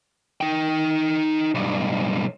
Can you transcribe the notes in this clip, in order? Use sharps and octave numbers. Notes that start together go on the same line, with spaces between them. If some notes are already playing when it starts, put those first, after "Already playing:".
D#4 G5
B1 G2